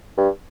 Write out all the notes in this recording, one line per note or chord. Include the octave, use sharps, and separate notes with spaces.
G2